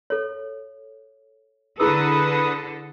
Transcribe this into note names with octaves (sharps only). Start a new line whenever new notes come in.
A4 C#5
D3 E4 G#4 A4 B4 D#6 E6